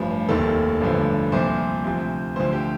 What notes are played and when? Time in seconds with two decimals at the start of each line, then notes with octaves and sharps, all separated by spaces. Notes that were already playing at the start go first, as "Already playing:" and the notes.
Already playing: A1 G2 F3
0.28 F1 D#2 D#3 A4
0.81 A1 G2 D3 F3
1.32 C2 A#2 F3 C5
1.84 D2 C3 F3
2.36 D2 D3 F3 C5
2.53 G4